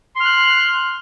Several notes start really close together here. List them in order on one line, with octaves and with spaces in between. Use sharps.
C6 F6 F#6